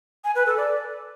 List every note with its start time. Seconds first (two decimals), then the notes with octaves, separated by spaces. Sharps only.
0.24 G#5
0.35 B4
0.46 A4
0.57 D5